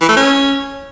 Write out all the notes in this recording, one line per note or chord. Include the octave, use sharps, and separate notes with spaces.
E3
A3
C#4